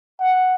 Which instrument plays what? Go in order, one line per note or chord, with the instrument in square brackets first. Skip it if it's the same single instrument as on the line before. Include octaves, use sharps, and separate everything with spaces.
[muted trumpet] F#5